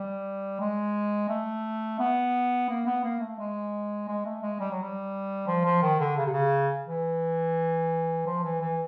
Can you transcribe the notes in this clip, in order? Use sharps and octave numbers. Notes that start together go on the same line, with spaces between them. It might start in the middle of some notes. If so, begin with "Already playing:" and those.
Already playing: G3
G#3
A3
B3
A#3
B3
A#3
A3
G#3
G#3
A3
G#3
G3
F#3
G3
F3
F3
D#3
D3
C#3
C3
C#3
E3
F3
E3
E3